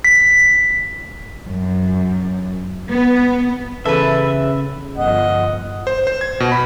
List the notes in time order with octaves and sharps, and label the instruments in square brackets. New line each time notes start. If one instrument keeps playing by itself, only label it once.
[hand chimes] B6
[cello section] F#2
B3
[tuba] C#3 [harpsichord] E3 [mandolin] A4 B4 [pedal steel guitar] E5
[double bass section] G1 F3 [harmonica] D#5 [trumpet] F#5
[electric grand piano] C5
C5
G#6
B2
B5